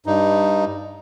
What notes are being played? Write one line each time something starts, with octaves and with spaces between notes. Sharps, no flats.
G2 D#4